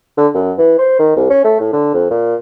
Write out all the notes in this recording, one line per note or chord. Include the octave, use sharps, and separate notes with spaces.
D3
F#2
E3
C5
D#3
C2
C#4
A3
A2
D3
F2
A#2